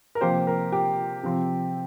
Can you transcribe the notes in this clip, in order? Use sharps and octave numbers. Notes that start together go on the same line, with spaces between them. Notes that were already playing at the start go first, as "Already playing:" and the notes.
A#4
C3 F3 A#3 G4 C5
A#4
G4
C3 F3 C4